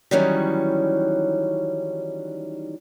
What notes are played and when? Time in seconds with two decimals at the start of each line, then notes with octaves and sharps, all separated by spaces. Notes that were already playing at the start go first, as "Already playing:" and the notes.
0.11 D#3 E3 F#3 G3 C#4 D#4